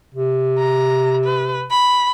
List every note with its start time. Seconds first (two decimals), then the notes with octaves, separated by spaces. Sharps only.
0.15 C3
0.59 A#5
1.24 B4
1.71 B5